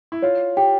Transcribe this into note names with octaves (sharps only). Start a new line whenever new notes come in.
E4
F4 C#5
G4 G5